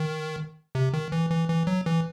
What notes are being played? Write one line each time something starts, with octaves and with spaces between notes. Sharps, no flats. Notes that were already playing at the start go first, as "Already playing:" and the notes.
Already playing: D#3
C3
D#3
E3
E3
E3
F#3
E3